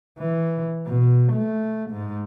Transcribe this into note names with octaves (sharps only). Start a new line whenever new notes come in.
E3
B2
A3
G#2